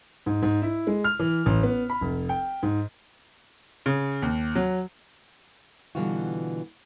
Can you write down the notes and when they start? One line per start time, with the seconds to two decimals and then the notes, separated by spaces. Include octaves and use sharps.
0.26 G#2
0.42 G#2
0.62 E4
0.87 G#3
1.04 F6
1.20 E3
1.46 A1
1.63 B3
1.90 B5
2.01 F1
2.29 G5
2.63 G#2
3.86 C#3
4.22 D#2
4.55 F#3
5.95 B2 D3 E3 G3 F4 F#4